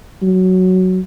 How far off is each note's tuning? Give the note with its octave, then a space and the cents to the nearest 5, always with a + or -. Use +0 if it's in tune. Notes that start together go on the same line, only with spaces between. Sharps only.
F#3 +5